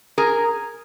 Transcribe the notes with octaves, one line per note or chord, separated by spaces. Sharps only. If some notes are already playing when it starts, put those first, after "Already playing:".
G#4 A#4